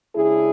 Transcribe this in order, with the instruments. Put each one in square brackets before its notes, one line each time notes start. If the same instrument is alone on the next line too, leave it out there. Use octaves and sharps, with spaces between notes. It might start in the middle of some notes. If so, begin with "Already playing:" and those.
[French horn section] C#3 G#3 D4 E4 G#4